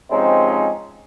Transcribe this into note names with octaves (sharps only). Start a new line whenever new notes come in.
C3 F3 G#3 C4 C#4 D#4